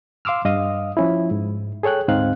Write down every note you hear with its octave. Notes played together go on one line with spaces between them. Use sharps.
F5 C6 D6 E6 F6
G2 D#5 F5 D#6
F3 C#4 E4
G#2
G#4 A4 C#5 G5 F#6
D2 G#2 C4 D#4 F5 F#6